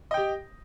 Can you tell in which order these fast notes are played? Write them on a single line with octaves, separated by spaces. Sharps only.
D#5 G5 G4